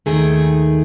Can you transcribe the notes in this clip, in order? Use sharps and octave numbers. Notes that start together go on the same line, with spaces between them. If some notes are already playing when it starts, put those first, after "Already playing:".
D#2 D#3 A3 G#4